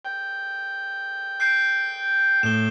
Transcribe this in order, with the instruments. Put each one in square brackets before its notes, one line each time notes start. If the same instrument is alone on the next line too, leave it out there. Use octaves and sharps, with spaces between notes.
[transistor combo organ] G5
[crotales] G6 C7 D7
[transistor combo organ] A2 [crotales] E7 G7